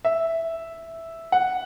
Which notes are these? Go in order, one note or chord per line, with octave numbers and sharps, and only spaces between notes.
E5
F#5